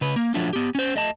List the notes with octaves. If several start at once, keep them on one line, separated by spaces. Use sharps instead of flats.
C#3 B4
A#3
F3 F#3 A3 D4 F4
B3 G4
C#4 C5
A3 D#5 A5